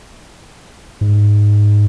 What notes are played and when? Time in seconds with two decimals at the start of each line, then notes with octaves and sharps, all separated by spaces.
1.01 G#2